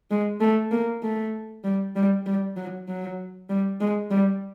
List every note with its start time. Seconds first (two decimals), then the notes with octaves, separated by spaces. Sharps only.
0.11 G#3
0.41 A3
0.72 A#3
1.03 A3
1.64 G3
1.96 G3
2.26 G3
2.57 F#3
2.88 F#3
3.49 G3
3.81 G#3
4.10 G3